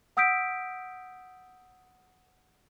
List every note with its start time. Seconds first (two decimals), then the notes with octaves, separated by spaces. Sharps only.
0.17 F#5 D#6 E6 G6 B6 D7